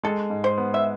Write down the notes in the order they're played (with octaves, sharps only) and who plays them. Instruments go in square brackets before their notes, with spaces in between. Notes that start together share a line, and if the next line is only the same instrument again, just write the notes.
[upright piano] G#3 [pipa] A4
[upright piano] G#2
[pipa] C5
[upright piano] B3
[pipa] E5